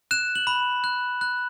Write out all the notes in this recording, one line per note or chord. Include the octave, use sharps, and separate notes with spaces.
F#6 E7
F#7
B5
F#6
F#6